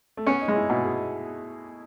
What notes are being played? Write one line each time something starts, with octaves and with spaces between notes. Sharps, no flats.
A3
B3 C#4
D#4
G#3
E4
B2 E4
G#4